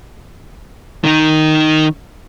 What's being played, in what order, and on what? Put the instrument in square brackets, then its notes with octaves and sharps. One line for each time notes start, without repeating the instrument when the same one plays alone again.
[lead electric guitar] D#3 D#4